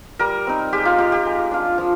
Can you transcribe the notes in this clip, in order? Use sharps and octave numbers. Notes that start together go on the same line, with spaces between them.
G3 A#4
C4 D#4
G#3 G4
F4
D#4 G4
G4
G#3
D4 F4
F3